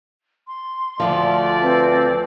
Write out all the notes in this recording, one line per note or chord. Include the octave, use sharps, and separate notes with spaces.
C6
D2 G2 F3 A3 D5
C4 B4